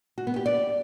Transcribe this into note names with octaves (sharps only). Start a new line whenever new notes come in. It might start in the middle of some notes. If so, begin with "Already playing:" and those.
F#4
B3
G4
D5